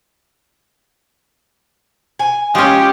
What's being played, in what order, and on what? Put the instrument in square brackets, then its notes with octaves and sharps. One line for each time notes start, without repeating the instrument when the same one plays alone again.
[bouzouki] G#5
[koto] G#3 C#4 [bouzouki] F4 [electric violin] G4